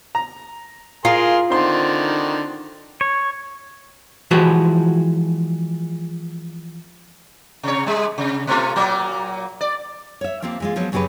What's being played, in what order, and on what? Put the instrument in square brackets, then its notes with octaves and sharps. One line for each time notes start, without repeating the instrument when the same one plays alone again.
[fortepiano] A#5
[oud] F4 [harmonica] G#4 A#4 C6
[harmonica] D3 D#3 [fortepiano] C4 C6
[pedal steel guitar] C#5
[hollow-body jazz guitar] E3 F3 G#3 F#4 G4 C5
[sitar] C3 C#5
G3 G#3
C3
B2 A3 F4
A#2 F#3 A#3
D5
[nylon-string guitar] C#5 E5
F3 A#3 C4 F4 G4
E3 G#3 F4
F3 F#3 G#3 B3
F#2 C#3 F#3 F#4 G4 B4